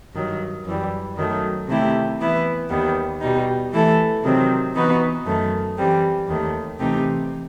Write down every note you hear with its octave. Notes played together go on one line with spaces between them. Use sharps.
G2 D#3 F#3
F#2 E3 G3
F#2 D#3 F#3 A3
C3 D#3 A3 E4 G4
E3 B3 E4 B4
D#2 D#3 G3 B3
B2 G3 D#4
E3 A3 E4 A4
C3 D#3 F#3 C4
E3 B3 D#4 F#4 B4
F#2 D#3 A3
E3 G3 C4
D#2 D#3 A3
C3 E3 A3 D#4 G4